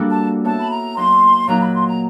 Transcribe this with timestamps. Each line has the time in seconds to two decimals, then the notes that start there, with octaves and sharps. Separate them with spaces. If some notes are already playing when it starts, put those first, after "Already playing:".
Already playing: G3 A#3 D4 F#4 A4
0.10 A5
0.44 B3 E4 A4 C#5 A5
0.60 B5
0.70 A#5
0.96 F#3 A#3 D#4 C6
1.48 A#2 F#3 A#3 D#4 A#5
1.61 B5
1.74 C6
1.87 A#5